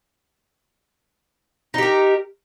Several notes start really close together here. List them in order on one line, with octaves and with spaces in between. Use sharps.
D#4 G4 A#4